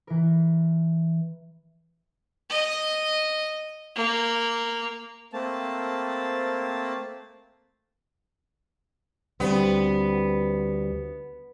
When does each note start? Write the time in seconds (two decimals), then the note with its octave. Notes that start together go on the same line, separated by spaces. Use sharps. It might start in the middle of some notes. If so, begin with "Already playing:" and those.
0.07 E3 A#4
2.50 D#5
3.95 A#3
5.33 A3 A#3 C4 A5
9.40 D2 G3 B3 C4